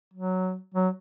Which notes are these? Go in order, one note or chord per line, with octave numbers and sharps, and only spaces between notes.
F#3
F#3